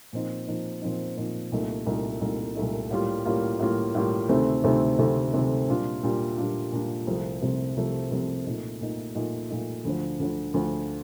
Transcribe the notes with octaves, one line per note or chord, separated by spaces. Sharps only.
A#2 F3 C4 D#4
A#2 F3 C4 D#4
A#2 F3 C4 D#4
A#2 F3 C4 D#4
C2 A#2 A3 D#4
C2 A#2 A3 D#4
C2 A#2 A3 D#4
C2 A#2 A3 D#4
A2 G3 A#3 F4
A2 G3 A#3 F4
A2 G3 A#3 F4
A2 G3 A#3 F4
D2 C3 D#3 A3 C4
D2 C3 D#3 A3 C4
D2 C3 D#3 A3 C4
D2 C3 D#3 A3 C4
A#2 G3 D4 F4
A#2 G3 D4 F4
A#2 G3 D4 F4
A#2 G3 D4 F4
C2 C3 F3 A3 C4
C2 C3 F3 A3 C4
C2 C3 F3 A3 C4
C2 C3 F3 A3 C4
A#2 A3 D#4
A#2 A3 D#4
A#2 A3 D#4
A#2 A3 D#4
D2 D3 F3
D2 D3 F3
D2 D3 F3